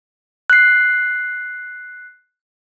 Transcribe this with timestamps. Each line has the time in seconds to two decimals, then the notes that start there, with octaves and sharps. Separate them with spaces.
0.50 F#6 C7